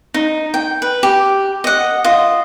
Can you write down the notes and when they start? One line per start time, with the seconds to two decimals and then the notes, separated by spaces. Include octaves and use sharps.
0.14 D#4
0.54 G5
0.82 B4
1.03 G4
1.64 D#5 F#5
2.04 F4 D#5